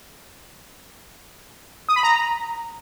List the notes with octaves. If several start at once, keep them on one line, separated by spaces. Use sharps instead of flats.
D#6
B5
A#5